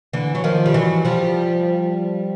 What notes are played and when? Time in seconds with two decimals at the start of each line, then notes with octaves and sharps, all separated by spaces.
0.13 D3 E3
0.35 F#3
0.44 D#3 F3
0.66 G3
0.74 E3 F#3
1.05 F3 G3